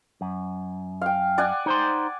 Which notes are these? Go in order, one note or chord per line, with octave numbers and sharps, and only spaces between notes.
F#2
F5 G5
D5 F#5 G#5
D#4 C5 C6